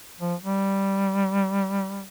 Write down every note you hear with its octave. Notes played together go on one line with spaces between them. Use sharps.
F3
G3